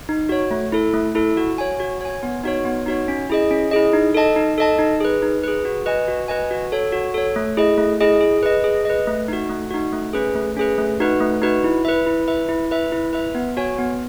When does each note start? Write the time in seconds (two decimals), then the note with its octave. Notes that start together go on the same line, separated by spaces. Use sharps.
0.09 D#4
0.29 F#4 C#5
0.51 A3
0.72 E4 A4
0.93 A3
1.15 E4 A4
1.37 F#4
1.58 C#5 G#5
1.80 F#4
2.01 C#5 G#5
2.23 B3
2.44 D#4 F#4 C#5
2.65 B3
2.86 D#4 F#4 C#5
3.08 C#4
3.30 E4 G#4 D#5
3.51 C#4
3.71 E4 G#4 D#5
3.93 D#4
4.14 A4 D#5 A5
4.36 D#4
4.58 A4 D#5 A5
4.79 D#4
5.00 G#4 B4
5.22 D#4
5.43 G#4 B4
5.65 F#4
5.86 B4 D#5 G#5
6.08 F#4
6.28 B4 D#5 G#5
6.51 F#4
6.72 A4 C#5
6.92 F#4
7.14 A4 C#5
7.36 A3
7.57 E4 G#4 D#5
7.78 A3
8.01 E4 G#4 D#5
8.21 G#4
8.43 B4 D#5
8.64 G#4
8.85 B4 D#5
9.07 A3
9.28 D#4 F#4
9.50 A3
9.71 D#4 F#4
9.93 A3
10.13 C#4 G#4 B4
10.36 A3
10.57 C#4 G#4 B4
10.78 A3
11.00 D#4 F#4 B4
11.20 A3
11.42 D#4 F#4 B4
11.64 E4
11.85 B4 E5
12.06 E4
12.28 B4 E5
12.49 E4
12.71 B4 E5
12.92 E4
13.13 B4 E5
13.35 B3
13.57 F#4 C#5 G#5
13.78 B3